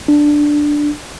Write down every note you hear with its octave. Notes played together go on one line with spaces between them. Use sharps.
D4